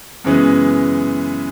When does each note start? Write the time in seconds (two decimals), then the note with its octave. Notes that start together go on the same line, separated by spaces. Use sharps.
0.24 F#2 C#3 E3 G#3 B3